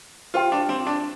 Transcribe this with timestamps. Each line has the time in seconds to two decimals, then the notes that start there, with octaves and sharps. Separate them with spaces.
0.34 F4 G4 C5 G5
0.52 D4
0.69 C4
0.87 D4